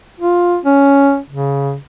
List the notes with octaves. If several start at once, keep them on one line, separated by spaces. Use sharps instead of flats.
F4
C#4
C#3